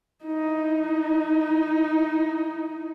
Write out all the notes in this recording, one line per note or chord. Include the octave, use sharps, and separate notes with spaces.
D#4 E4